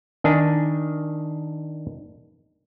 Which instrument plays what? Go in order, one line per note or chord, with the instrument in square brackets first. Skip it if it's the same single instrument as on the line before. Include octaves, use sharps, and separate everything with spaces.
[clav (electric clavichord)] D#3 D4 G#5